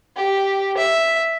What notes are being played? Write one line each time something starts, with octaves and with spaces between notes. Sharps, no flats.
G4
E5